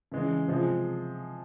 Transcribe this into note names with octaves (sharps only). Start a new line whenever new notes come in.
C#3 E3 G#3
C3 F3 G#3